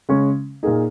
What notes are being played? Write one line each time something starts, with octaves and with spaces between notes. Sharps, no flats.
C#3 G#3 C#4
A#2 A#3 D#4 G#4